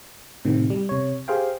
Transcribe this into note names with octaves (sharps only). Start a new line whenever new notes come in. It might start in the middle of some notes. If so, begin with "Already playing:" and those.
A2 C3 D#3
G3
C3 C#5
G4 G#4 C5 F5 G5